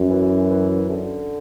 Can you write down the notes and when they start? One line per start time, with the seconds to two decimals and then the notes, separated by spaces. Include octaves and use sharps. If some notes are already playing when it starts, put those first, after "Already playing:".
Already playing: F#2
0.10 E3
0.50 E3
0.90 D3